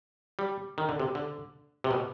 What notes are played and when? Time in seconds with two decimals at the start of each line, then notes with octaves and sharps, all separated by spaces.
0.39 G3
0.78 D#3
0.89 D3
1.00 C3
1.15 D3
1.84 C3
1.91 B2